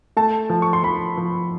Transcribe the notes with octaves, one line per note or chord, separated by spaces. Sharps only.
A3 A5
F3
C#6
C6
F3 B5
F3